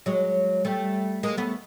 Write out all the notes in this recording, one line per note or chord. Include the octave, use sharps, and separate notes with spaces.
F#3 G#3
G3 A3
G#3 A#3
A3 B3